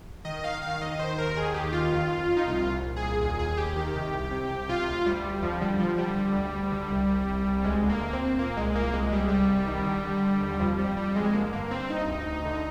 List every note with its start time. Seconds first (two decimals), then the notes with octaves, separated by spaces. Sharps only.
0.25 D#3 D#5
0.43 D#3 F5
0.62 D#3 F5
0.81 D#2 D#5
0.99 D#3 C5
1.18 D#2 A#4
1.36 D#3 G#4
1.54 D#2 G4
1.73 D#3 F4
1.92 F2
2.10 F2
2.28 F2
2.37 D#4
2.47 C2 F4
2.66 A#2
2.84 C2
2.96 G#4
3.03 A#2
3.21 D#2 G#4
3.39 D#2 G#4
3.57 D#2 G4
3.76 D#3 G4
3.95 C3
4.14 C2
4.31 C3
4.50 C2
4.69 C3 F4
4.87 D2
5.06 D2 G3
5.24 D2
5.42 F2 F3
5.61 D3 G3
5.79 D3 F3
5.98 D3 G3
6.17 D3
6.34 D2
6.54 D2
6.71 D3
6.90 C2
7.09 C2
7.27 C2
7.46 C2
7.64 D2 G#3
7.82 D3
7.89 A#3
8.01 D2
8.13 C4
8.19 D2
8.38 A#2 A#3
8.56 C2 G#3
8.75 A#2 A#3
8.93 C2 G#3
9.12 C2 G3
9.20 G#3
9.28 C2 G3
9.49 C2
9.67 D#3
9.86 D3
10.04 D3
10.22 D3
10.41 D#2
10.59 F2 F3
10.78 F2 G3
10.96 F2 G3
11.15 F2 G#3
11.33 D3 A#3
11.52 G2 A#3
11.71 G2 C4
11.89 G2 D#4
12.07 D2
12.25 D2
12.45 D3